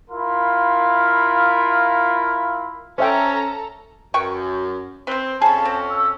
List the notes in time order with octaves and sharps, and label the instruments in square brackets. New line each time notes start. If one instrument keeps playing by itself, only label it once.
[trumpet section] E4 F4 A#4 F5 B5 C6
[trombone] C#4 [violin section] A4 A5 A#5 [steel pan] C5 E5 G5
[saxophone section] F#2 [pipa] B4 G5 C#6
[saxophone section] C4 [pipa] B4 C5
[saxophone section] F2 C#4 [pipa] G#4 B5 [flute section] A5
[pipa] C4
[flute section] E6